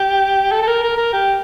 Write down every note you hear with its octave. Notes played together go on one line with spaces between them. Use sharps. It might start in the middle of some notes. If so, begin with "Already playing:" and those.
Already playing: G4
A4
A4
A#4
A#4
A#4
G4